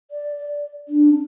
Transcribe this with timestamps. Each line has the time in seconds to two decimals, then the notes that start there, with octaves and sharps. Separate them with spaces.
0.11 D5
0.37 D5
0.88 D4
1.10 C#4